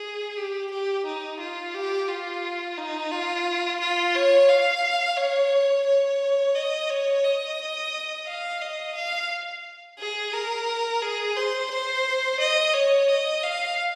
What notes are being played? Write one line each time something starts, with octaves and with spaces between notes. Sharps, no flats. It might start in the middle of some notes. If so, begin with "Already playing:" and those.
Already playing: G#4
G4
G4
D#4
F4
G4
F4
D#4
F4
F4
C#5
F5
C#5
C#5
D#5
C#5
D#5
F5
D#5
F5
G#4
A#4
G#4
C5
C5
D#5
C#5
D#5
F5